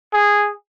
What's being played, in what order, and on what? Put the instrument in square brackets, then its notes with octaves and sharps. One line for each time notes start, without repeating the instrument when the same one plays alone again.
[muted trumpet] G#4